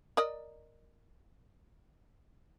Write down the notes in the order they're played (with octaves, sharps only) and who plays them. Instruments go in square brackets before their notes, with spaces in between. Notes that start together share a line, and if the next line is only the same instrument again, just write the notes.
[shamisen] A#4 D5 D#5